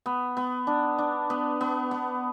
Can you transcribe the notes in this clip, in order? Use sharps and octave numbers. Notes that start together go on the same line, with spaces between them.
B3
B3
D4
D4
B3
B3
B3